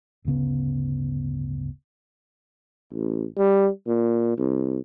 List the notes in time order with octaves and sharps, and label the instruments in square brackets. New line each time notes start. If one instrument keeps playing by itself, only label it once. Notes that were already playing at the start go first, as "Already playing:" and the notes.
[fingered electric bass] D1 G1 C#3 B3
[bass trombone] A1
G3
A#2
C2